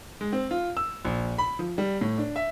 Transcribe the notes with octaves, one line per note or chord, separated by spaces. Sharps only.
G#3
C4
F4
E6
A#1
B5
F3
G3
A2
D4
E5